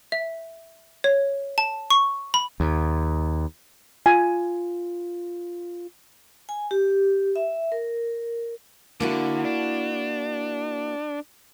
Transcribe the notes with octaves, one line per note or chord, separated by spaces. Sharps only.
E5
C#5
A5
C#6
B5
D#2
F4 G#5
G#5
G4
E5
A#4
D3 A#3 E4 F#4
D4